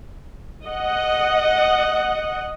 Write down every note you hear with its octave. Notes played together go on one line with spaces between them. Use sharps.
D#5 F#5